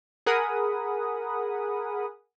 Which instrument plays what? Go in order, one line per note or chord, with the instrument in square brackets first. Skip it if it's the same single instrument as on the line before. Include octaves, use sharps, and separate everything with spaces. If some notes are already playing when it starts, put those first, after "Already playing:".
[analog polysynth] G#4 A#4 F#5 G#5 B5 D#6